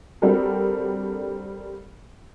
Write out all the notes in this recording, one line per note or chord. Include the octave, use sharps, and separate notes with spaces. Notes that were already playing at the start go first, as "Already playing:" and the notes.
G3 C4 D4 F#4 A4 A#4